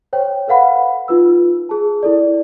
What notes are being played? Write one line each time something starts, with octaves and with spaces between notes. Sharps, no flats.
C5 C#5 G5
A4 B4 F5 F#5 B5
D#4 F4 B4 E6
G#4 A5
E4 A4 D5